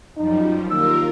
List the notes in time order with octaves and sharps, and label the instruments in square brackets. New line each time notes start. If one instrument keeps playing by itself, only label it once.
[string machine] F#2 F3 G3 [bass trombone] D#4
[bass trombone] D#2 [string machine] F4 A#4 [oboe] E6